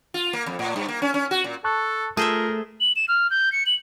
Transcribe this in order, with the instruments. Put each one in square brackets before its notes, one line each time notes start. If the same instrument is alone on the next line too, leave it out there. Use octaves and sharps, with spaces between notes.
[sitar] F4
A#3
F2
A2
G2
A#3
C#4
C#4
F#4
A#2
[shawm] A4 [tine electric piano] A5 C#6 F#6
[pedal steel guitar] A3 [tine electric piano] F4 A5 [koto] G#4 C5 E5 [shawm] A#4
[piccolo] F#7
E7
F6
G6
C#7
F#7